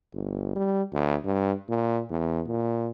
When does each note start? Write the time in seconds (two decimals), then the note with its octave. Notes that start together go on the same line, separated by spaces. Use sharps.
0.13 G1
0.56 G3
0.92 D2
1.25 G2
1.69 A#2
2.10 E2
2.47 A#2